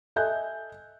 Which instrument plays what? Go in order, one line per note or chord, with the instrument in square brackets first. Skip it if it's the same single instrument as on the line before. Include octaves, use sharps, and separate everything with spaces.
[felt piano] A4 D#5 E5 G#5 F#6 G6